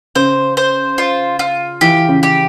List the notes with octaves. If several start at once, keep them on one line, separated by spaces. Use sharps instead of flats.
C#3 C5
C5
F4
F4
E3 G4
C#3
G4